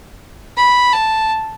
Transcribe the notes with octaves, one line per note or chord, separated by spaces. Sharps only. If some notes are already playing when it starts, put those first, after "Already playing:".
B5
A5